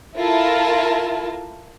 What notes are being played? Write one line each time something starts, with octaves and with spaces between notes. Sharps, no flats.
E4 F4 A4 A#4 A5